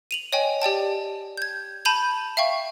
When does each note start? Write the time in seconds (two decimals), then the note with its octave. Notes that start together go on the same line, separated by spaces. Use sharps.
0.11 D#7 F7 F#7
0.33 C#5 D#5 G5 G#5
0.62 G4 D5 G5 A5
1.37 G6 G#6
1.85 A5 B5 G6 D#7 F7 F#7
2.37 E5 F5 G5 C#6